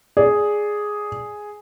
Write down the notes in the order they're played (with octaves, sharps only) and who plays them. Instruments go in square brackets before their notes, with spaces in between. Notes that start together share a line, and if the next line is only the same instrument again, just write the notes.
[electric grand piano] G#4 [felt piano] D5